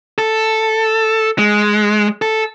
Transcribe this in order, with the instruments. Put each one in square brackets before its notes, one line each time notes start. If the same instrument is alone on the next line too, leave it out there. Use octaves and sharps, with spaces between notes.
[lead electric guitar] A4
G#3
A4